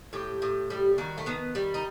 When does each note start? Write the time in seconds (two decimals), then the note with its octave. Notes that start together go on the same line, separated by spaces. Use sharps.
0.13 A2 G4
0.42 A2
0.70 G3
0.98 D#3 F#4
1.18 A3
1.26 D#3 B3
1.55 G3
1.74 D#4